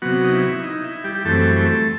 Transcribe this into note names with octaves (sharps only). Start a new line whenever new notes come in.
C3 F#3 B3 F#4
D#4
E4
D#4
E4
G3 G4
G4
F#2 E3 G3 A3 C4 A4
A3 A4